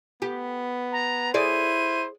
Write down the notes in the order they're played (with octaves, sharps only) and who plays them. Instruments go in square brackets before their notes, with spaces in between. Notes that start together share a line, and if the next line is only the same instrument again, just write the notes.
[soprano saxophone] B3 [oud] G4
[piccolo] A#5
[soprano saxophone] E4 [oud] G#4 D5 [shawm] C5 [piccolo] D#7